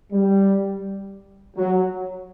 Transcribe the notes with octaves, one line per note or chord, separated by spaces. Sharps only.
G3
F#3